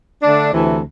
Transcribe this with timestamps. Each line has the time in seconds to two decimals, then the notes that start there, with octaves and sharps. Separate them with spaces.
0.22 D3 A3 D4
0.51 D2 C3 E3 A3